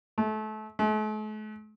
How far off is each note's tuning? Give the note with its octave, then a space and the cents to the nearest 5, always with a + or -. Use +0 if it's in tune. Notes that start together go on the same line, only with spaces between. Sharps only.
A3 -30
A3 -45